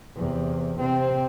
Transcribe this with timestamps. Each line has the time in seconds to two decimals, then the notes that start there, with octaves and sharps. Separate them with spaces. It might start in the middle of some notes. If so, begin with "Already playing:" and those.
0.15 E2 C3
0.79 C3 C4